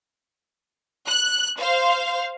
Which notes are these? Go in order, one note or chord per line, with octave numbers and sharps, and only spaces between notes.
F#6
C5 F5